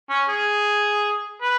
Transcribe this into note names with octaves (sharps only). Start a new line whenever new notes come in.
C#4
G#4
B4